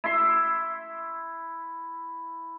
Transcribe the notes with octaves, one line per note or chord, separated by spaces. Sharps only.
E4 E5 C6